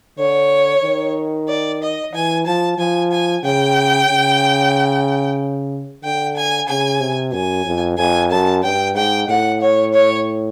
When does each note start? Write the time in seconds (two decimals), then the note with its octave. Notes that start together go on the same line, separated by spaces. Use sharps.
0.18 D3 C#5
0.83 D#3
1.49 D5
1.81 D#5
2.13 E3 G#5
2.46 F3 A5
2.78 F3 G#5
3.11 G#5
3.44 C#3 G5
4.08 C#3
6.03 D3 G5
6.36 G#5
6.68 C#3 G#5
7.00 C3
7.33 F#2 G#5
7.65 F2
7.98 F2 G#5
8.31 F#2 A5
8.63 G2 G5
8.95 G#2 G5
9.29 A2 F#5
9.61 C#5
9.93 C#5